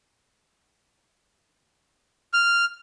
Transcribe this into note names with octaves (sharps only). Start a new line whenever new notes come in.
F6